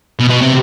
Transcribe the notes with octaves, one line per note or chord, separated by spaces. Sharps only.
B2
B2
C3